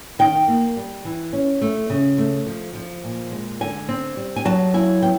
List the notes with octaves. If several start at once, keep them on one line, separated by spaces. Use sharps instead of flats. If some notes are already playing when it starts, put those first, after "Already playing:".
D#3 G5
A#3
G3
E3
C#4
A3
C#3
A3
F3
F3
A#2
G#3
D3 G#5
C4
G3
G#5
F#3 A5
E4 G#5
B3 G5